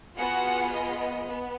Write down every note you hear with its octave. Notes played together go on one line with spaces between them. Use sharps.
B3 F4 F#4 G#4 F#5
D#5
B3